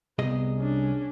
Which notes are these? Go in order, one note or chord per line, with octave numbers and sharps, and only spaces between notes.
C2 B3 G#4 D#5
C#4 D4